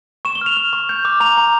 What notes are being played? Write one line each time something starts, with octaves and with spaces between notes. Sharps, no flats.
C#6 E7
G7
F6 F7
F6
C#6
G6
D6
A#5 F7
A#5